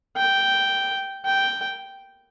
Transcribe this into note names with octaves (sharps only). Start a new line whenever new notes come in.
G5
G5